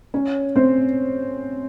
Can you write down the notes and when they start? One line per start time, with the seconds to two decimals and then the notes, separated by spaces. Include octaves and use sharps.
0.14 C#4 C#5
0.56 C4 C5